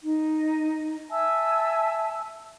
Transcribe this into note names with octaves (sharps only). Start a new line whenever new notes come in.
D#4
E5 G#5 A5 E6